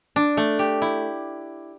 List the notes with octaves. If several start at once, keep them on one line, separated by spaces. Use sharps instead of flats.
D4
A3
G4
E4